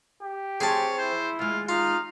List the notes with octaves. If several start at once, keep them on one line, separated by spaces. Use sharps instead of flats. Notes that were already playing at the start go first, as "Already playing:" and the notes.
G4
F3 C4 G#4 C#5 A5
E4 C5
D#2 G#3 F4
D#4 F4 F5